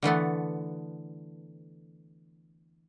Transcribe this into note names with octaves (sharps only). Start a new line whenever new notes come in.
D3 E3 A3 B3